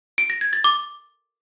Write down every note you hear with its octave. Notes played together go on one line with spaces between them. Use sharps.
D7
A#6
G#6
A6
D6